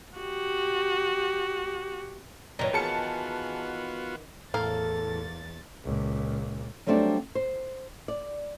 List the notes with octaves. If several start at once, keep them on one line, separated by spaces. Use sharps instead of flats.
F#4 G4
F#2 A#2 D#3 E3 C#5 D5 A#5
B3 F4 F#4 G#4 A5 F6 C#7 D7
E2 A2 A#3 A4 F5 A6
C#2 A#2
F#3 G3 A3 C4 D4 F#4
C5
D5